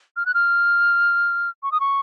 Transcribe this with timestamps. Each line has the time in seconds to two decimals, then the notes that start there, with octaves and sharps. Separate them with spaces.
0.17 F6
0.26 F#6
0.34 F6
1.63 C#6
1.72 D#6
1.80 C#6